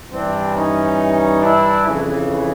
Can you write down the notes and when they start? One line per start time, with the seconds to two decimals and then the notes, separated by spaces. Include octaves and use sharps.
0.12 G2 E3 C4 D4
0.55 C#4 D#4
1.42 D4 E4
1.85 F2 C#3 E3